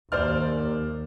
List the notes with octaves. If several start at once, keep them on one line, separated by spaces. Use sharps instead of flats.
D#2 C5 D5 F6